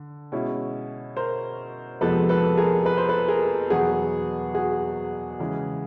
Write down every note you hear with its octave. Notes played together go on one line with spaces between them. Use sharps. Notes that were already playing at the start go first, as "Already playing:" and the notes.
Already playing: D3
B2 G#3 C#4 E4
A#4 C5
F2 C3 F3 G#3 B3 A4 B4
A4 B4
G#4 A#4
B4
C5
A4 B4
G#4 A#4
E2 B2 F#3 B3 F#4 G#4
F#4 G#4
C#3 E3 G#3 C#4